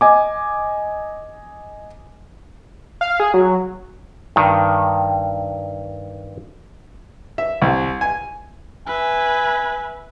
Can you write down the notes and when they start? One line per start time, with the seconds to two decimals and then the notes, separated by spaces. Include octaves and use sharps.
0.01 D#5 G#5 D6
3.01 F5
3.20 G#4
3.34 F#3
4.36 G2 D#3
7.38 E5
7.62 C2
8.01 G#5
8.87 B4 E5 G#5